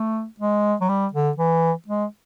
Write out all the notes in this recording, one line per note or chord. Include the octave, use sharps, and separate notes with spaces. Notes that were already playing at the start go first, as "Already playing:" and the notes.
Already playing: A3
G#3
F#3
G3
D3
E3
G#3